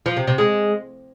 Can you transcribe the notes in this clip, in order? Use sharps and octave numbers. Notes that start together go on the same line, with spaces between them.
F3
C3
C3
G#3